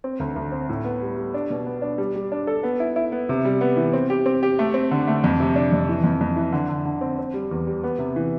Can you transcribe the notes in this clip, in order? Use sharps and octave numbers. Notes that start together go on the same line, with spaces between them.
C4
D2
D2
C4
A2
B3
G3
G3
D4
B2
B3
D4
G3
G3
D4
A4
B3
E4
E4
B3
C3
G3
B3
E3
C4
G4
C4
G4
A3
C4
D3
A3
F2
C3
D4
F2
E3
F2
F2
E3
D3
D3
D3
C4
C4
G3
E2
G3
B3
C3
E3